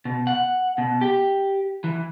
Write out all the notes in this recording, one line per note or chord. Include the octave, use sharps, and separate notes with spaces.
B2
F#5
B2
G4
E3